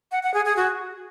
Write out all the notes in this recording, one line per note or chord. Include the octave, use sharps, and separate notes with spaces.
F#5
F#5
G#4
G#4
F#4